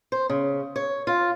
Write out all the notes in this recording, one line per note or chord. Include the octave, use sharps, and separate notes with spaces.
C5
C#3
C#5
F4